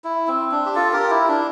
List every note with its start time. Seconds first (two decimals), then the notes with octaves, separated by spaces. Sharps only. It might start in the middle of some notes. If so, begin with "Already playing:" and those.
0.04 E4
0.28 C4
0.51 D4
0.66 G4
0.75 F4 A4
0.93 G4 A#4
1.10 E4
1.28 D4